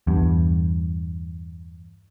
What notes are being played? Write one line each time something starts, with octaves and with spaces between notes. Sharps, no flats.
E2 G2